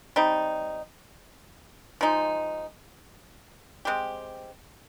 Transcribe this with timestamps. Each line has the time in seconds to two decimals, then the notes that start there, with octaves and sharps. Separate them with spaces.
0.16 G3 C4 D#4
2.01 F3 G#3 D#4
3.85 G#3 C4 G4